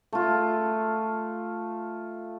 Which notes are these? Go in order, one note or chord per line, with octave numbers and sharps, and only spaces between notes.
A3 F4